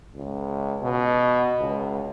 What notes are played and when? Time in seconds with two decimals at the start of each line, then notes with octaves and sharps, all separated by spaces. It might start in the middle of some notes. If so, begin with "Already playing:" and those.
0.15 C#2
0.82 B2
1.61 C#2